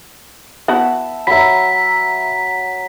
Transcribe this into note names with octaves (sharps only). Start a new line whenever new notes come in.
B3 E4 F#4 E5 A5 B5
F#3 E5 A#5 B5 B6